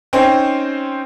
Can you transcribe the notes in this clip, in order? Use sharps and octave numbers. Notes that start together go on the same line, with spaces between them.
C4 C#4 D#4 C5 G5